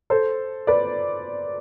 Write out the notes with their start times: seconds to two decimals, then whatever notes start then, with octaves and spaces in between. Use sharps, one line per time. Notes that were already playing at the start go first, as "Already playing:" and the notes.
0.10 A4 C5
0.67 B4 D5